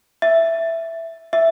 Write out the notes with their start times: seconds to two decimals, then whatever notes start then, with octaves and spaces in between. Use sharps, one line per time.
0.22 E5
1.33 E5